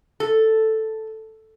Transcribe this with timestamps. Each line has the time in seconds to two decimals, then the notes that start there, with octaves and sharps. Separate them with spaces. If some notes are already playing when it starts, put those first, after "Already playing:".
0.20 A4